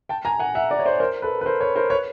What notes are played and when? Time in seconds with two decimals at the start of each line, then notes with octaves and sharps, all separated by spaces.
0.09 G5 A5
0.25 G#5 A#5
0.39 F#5 G#5
0.55 E5 F#5
0.70 D5 E5
0.79 C#5
0.85 C5 D5
1.00 A#4 C5
1.22 A4 B4
1.41 B4
1.46 A#4 C5
1.61 B4 C#5
1.76 A#4 C5
1.90 B4 C#5